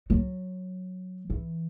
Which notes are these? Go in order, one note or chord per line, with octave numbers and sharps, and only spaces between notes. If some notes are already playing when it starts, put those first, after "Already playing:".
F#3
E3